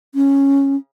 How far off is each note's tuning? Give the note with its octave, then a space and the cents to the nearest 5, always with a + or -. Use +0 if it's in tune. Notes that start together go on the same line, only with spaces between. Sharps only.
C#4 -5